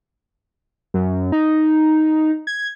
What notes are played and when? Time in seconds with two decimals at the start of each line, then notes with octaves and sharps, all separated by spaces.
0.94 F#2
1.32 D#4
2.47 G#6